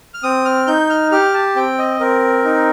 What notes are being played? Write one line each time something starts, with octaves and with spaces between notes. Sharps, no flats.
F6
C4 D#6
F6
D#4 G6
F6
G4 F6
A5
C4 G5
D#5
C4 A#4
D#4